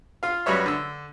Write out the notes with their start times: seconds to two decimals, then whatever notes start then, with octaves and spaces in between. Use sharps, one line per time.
0.23 F4 F5
0.46 F#2 G3 B3 F#4 C#5 E5
0.66 D3 E6